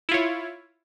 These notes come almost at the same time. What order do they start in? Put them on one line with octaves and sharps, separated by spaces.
E4 F4 C#5